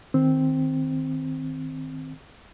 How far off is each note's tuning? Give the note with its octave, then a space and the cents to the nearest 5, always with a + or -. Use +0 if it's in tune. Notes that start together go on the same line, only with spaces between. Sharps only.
D#3 +0 C4 +0